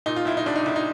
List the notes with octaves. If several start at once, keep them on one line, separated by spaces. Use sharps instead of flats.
A#2 D#4
F4
B1 E4
D#4
B1 D4
D#4
B1 E4
D#4